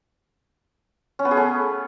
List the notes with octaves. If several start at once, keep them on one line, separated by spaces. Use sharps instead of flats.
C#4
B3
G#4
A3